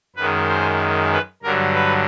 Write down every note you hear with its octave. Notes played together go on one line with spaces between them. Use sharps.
F#2 D#3 G#3 B4
C5
B4
G2 D3 F#3 A#4
B4